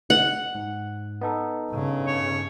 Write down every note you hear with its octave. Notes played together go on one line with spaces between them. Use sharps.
F#5
G#2
B3 D#4 A4
G2 C#3
C#5